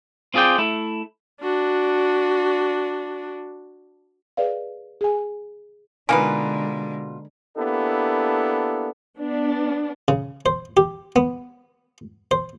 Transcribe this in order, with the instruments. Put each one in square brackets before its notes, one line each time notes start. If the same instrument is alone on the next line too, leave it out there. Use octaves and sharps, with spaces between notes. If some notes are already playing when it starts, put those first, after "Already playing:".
[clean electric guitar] C4 F4 G#4 D5 G5
A3 E4
[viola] D4 F#4
[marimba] G#4 B4 D5 D#5 F5
G#4 G#5
[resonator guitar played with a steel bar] B2 F4 [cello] D3 G#3 [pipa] A#3 D#4 B4 [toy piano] G#5
[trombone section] A#3 B3 D4 E4 G4 A4
[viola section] B3 D4
[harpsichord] C#3
C5
G4
B3
C5